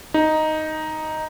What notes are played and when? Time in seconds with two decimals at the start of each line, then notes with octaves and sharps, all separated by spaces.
0.14 D#4